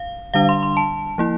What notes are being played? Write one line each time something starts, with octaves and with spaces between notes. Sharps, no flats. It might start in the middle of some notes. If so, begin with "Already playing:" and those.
Already playing: F5
D3 G3 D4 F5
C6
C6
A5
F3 A#3 E4